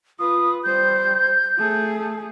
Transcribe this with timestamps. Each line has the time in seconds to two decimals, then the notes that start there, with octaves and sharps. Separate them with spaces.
0.19 F4 B4 D#6
0.64 G3 C5 G6
1.58 A3 G#4